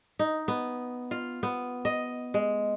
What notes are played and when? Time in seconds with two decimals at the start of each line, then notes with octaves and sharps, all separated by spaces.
0.19 D#4
0.48 B3
1.11 F4
1.43 B3
1.85 D#5
2.34 G#3